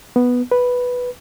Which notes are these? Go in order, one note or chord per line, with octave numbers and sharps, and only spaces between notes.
B3
B4